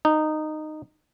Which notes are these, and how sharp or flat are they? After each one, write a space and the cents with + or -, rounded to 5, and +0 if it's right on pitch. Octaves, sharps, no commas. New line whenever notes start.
D#4 -15